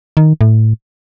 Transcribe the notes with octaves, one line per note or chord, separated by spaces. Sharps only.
D#3
A2